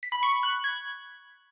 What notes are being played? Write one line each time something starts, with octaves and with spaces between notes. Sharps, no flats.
B6
B5
C#6
F#6
G#6